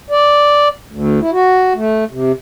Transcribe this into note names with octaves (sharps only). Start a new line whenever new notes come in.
D5
D2
E4
F#4
A3
C3